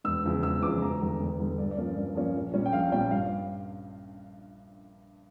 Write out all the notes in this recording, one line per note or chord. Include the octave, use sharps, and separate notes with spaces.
E1 E6
E2 C#3 F3
E1 E6
E2 C#3 F3 D6
E1 A#5
E2 D3 G3
E1
E2 D3 G3
G2 D5
D5
F3 A#3 C#4
G2 D5
F3 A#3 C#4
A#1
A#2 G3 C#4
G5
A#1 F5
A#2 G3 C#4 G5
G2 F5